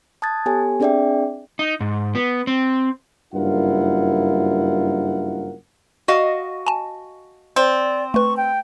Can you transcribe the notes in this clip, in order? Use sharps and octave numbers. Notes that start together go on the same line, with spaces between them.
A5 D#6 F#6 G#6 A6
B3 G4 A4 C#5 G#5
C4 D4 G#4 D5 E5 G5
D#4
G#2
B3
C4
F#1 G2 E4 F4 A#4 F#5
F#4 D#5 F5
G#5 A5
C4 D5
A3 B4 C#6
G5